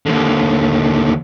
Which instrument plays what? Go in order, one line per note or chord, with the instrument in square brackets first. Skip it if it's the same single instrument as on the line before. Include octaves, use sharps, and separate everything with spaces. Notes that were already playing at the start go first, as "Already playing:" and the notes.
[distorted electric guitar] D#2 D3